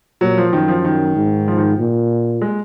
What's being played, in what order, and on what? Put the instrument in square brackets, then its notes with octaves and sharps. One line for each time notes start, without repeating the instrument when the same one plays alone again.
[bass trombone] A#2 [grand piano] F#3
[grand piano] F3
[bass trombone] F#2 [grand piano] D#3
[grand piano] F3
D#3
[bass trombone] G#2
[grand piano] F3
D#3
[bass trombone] A#2
[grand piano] G#3